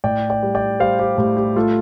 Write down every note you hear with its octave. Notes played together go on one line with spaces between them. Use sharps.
A2 D5 G5
D5 G5
G3
D5 G5
G3 C5 F5
G4 C5
A2 G4 C5
G4
A3 F4 A4